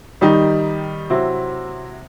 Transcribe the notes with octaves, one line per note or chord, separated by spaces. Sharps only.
D#3 G3 D#4 G4
C3 F#3 C4 E4